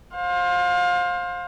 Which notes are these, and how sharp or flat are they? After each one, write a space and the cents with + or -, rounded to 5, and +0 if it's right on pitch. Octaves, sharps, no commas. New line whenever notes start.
C5 +20 F5 +30